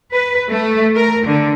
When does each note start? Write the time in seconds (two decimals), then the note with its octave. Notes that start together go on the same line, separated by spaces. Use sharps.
0.11 B4
0.50 A3
0.95 A#4
1.25 D3